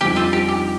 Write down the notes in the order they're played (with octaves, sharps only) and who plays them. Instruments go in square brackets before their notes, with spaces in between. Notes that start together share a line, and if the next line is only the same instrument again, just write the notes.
[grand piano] F2 D3 G3 C4 D#4 [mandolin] G4
[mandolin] F4 A4
G4
G4